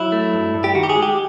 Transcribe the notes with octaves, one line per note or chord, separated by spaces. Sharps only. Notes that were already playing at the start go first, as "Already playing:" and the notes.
Already playing: F#3 E4
A3
G2
G2
G4
D#3 F#4
G4
G#4
G#3
G4